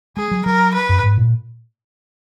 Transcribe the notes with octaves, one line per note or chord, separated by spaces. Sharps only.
G#3 G#4
F#3
F#3 A#4
B4
F#2
G#2
A#2